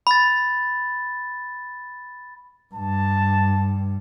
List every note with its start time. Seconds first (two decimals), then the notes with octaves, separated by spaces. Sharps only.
0.07 B5 A6
2.75 G2 A5